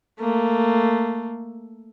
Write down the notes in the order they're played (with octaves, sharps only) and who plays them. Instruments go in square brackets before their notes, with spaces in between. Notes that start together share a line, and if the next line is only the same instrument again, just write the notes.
[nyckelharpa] A3 A#3